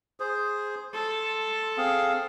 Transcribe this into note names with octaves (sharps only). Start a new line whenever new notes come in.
G#4 C5
A4 C6
C4 G#4 F5